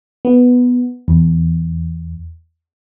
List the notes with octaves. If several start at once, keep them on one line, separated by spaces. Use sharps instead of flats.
B3
E2